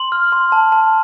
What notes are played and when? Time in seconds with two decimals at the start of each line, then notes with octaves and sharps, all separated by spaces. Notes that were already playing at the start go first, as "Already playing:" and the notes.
Already playing: C6 F#7
0.12 F6
0.32 C6
0.52 A5
0.72 A5